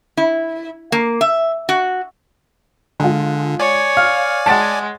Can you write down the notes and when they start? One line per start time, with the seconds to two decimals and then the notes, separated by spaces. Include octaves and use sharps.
0.17 E4
0.92 A#3
1.21 E5
1.69 F#4
3.00 D3 G#3 F4
3.59 C#5 D5 G#5
3.97 F5 F6
4.46 G#3 F#5 A5 A6 C#7